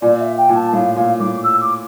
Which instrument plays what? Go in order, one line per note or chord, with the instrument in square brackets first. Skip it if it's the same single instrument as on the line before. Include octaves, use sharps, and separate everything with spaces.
[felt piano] A#2 [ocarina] D5
[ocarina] E5
G5
[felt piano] A#2
[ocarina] A5
[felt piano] A2 [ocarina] F5
[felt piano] A#2 [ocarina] F5
[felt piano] A2 [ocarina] D6
[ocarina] E6
D6